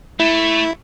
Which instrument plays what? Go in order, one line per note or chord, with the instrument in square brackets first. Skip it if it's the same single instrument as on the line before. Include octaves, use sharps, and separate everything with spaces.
[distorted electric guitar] A3 [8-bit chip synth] E4